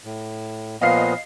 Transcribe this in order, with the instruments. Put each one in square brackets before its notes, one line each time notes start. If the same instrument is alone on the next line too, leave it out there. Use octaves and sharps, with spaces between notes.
[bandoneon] A2
[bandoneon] A#2 F3 B3 [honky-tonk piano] D#5 F5 C7